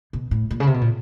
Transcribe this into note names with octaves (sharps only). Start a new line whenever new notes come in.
B2
A2
A#2
C#3
C3
B2
A#2